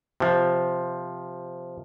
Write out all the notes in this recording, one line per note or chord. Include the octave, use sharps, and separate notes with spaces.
C3 F3